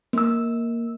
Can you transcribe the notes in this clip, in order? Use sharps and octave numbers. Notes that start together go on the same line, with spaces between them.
A#3 E6